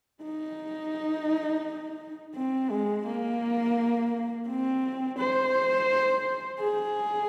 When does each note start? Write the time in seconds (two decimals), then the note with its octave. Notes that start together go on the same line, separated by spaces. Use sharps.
0.23 D#4
2.35 C4
2.70 G#3
3.06 A#3
4.48 C4
5.19 C5
6.60 G#4